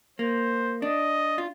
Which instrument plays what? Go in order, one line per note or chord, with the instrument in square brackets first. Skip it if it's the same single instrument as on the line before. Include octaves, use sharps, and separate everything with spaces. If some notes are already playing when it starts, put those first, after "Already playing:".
[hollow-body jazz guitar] A#3 [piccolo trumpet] C5
[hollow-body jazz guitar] D4 [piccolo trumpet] D#5
[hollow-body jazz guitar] F4